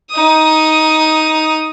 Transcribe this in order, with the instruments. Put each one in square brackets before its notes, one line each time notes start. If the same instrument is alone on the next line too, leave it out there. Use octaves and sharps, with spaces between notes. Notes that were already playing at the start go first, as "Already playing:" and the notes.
[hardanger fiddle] D#4 D#6